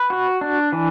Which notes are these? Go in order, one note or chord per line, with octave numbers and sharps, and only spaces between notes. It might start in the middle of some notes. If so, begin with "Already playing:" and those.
Already playing: B4
F#4
D4
E3